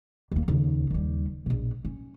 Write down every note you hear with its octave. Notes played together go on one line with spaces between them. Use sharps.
D#2 A#3
D#2 C#3
D#2 G3
A#1 B2
C#4